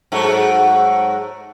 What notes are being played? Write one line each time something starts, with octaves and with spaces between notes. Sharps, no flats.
G#2 F#3 A3